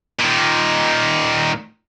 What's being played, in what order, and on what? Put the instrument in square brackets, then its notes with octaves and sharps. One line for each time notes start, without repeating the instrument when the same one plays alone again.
[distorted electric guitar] A#2 D#3